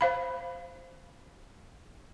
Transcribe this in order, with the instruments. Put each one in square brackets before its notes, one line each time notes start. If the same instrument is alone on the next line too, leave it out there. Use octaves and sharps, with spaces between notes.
[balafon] C5 F5 B5